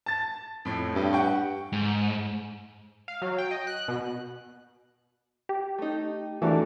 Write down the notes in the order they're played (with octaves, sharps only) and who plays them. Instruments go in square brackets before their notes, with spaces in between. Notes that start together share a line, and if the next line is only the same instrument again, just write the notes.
[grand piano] A5 A6
F2 A2
[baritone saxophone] G2
[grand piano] F#5 G5 C#6
[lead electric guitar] G#2
[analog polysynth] F5
F#3
G5
D#5
F#6
B2
[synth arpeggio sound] G4
[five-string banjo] A3 D#4
[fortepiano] E3 A3 D4 [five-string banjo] G3 A#3 F#4